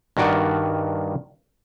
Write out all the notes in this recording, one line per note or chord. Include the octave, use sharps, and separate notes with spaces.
G2 D#3 F#4 A#4 D5 F#5